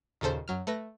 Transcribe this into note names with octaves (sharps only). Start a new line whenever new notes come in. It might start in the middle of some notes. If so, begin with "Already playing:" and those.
D#2 A#2 C#3 A4 C5
F#2 F#3 F6
A3 B4 A#6